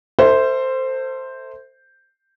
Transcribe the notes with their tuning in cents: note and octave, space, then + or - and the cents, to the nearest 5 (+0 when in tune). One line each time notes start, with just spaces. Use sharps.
A4 +40 C5 +0 E5 -20